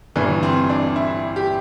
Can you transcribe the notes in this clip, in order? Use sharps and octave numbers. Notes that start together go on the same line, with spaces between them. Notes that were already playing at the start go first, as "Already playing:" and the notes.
G1 G2 E3 D4
C4
D4
E4
G4